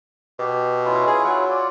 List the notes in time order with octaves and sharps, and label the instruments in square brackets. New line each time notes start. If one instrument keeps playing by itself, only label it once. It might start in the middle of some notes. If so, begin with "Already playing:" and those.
[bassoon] B2 [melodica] G4
[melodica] C#4 E4 F4
[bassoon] G#4
F#3
[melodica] F4 D5